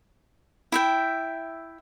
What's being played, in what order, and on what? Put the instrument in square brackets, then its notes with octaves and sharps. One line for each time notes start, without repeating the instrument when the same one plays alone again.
[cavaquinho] E4 E5 G5